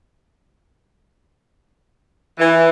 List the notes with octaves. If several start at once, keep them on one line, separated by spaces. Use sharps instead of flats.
E3